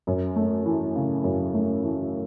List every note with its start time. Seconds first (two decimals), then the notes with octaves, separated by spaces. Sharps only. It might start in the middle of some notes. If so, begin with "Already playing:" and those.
0.07 F#2
0.36 A3
0.65 E3
0.96 C#3
1.24 F#2
1.54 A3
1.83 E3